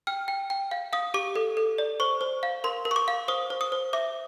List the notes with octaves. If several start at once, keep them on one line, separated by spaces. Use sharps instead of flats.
G5 F6
G5
G5
F5
F5 D#6
G4 D6
A4
A4
D5
C5 C#6
C5
F5
A#4 C6
A#4
C#6
D6
F5
C5 D#6
C5
D#6
C5
E5 D6